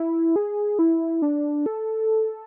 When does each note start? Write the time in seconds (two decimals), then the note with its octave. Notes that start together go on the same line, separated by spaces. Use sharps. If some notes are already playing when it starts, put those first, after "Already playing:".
Already playing: E4
0.36 G#4
0.79 E4
1.22 D4
1.66 A4